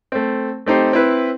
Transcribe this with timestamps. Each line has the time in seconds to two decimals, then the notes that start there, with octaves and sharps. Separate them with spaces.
0.12 A3 C4
0.66 A3 C4 D#4 G4 C5
0.93 C4 E4 B4